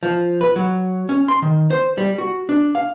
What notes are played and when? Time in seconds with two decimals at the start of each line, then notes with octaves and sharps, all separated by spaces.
0.03 F3
0.41 B4
0.56 F#3
1.09 C#4
1.28 C6
1.42 D#3
1.71 C5
1.98 G3
2.18 F#4
2.49 D4
2.75 F5